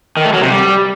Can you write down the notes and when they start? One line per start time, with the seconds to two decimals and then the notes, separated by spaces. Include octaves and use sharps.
0.17 D#3
0.25 A3
0.33 F#3
0.42 C3
0.50 G3